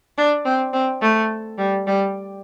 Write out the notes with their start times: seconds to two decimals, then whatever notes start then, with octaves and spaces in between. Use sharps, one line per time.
0.18 D4
0.45 C4
0.73 C4
1.02 A3
1.58 G3
1.87 G3